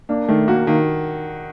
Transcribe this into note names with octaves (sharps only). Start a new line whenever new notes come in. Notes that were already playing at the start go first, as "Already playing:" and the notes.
A#3 D4
D#3 A3
A#3 F#4
D#3 A#3